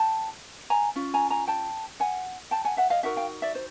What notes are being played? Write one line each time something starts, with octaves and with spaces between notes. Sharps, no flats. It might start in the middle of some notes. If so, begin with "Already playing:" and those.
Already playing: G5 A5
G#5 A#5
C#4 F4
G#5 A#5
G#5 A#5
G5 A5
F#5 G#5
G5 A5
F#5 G#5
E5 F#5
D#5 F5
D#4 F#4 A#4 E5 F#5
F5 G5
D5 E5
C5